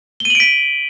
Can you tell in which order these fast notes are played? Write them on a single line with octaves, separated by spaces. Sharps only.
G7 D#7 F#7 D7 B6